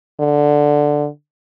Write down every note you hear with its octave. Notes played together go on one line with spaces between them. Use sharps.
D3